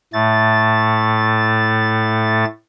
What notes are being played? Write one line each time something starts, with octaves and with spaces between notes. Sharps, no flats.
A2 A3 A6